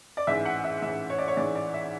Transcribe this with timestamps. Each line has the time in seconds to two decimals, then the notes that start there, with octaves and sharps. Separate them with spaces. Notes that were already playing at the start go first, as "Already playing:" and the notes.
0.17 D5
0.27 A1 G#2 E3 E5
0.45 F#5
0.64 E5
0.82 A1 G#2 E3 E5
1.10 C#5
1.18 D5
1.28 C#5
1.37 A1 G#2 E3 D5
1.55 D5
1.74 E5